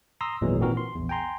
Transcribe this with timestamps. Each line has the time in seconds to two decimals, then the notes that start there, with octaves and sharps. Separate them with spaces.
0.21 A#5 C6 D#6 E6 A#6
0.41 G#1 E2 A#2 E3 F#3 G#3
0.59 A#2 D#3 E3 C4 F#4 A#4
0.77 C6
0.95 A#1 E2
1.09 G5 G#5 A#5 C6